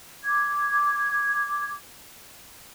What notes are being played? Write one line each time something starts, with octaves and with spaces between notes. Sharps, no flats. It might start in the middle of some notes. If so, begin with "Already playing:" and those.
D6 G#6